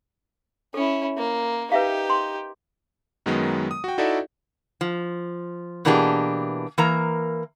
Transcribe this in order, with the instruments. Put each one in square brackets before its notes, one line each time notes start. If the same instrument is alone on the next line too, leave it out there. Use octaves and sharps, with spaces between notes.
[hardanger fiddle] C#4 E4 [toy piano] A4
[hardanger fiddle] A#3
[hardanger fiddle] D#4 G4 [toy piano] B4 E5 F5
[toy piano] C6
[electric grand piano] F#2 D#3 F#3 G#3 B3
D#6
F#4 G5
D#4 E4 F#4 A4 D5 E5
[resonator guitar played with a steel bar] F3
B2 E3 A#3 D4 G4 G#4
E3 A#3 A#4 A#5